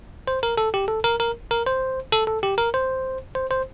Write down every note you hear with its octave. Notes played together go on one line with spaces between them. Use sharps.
C5
A#4
A4
G4
A4
A#4
A#4
A#4
C5
A4
A4
G4
A#4
C5
C5
C5